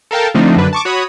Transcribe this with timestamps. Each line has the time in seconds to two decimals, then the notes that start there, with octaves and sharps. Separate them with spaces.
0.11 A4 A#4 F5 G5 A5
0.34 D3 F3 A3 C4 D4 D#4
0.57 F#2 D3 D4 B4
0.73 A5 C#6 D6
0.85 F#4 C#5 B5 D#6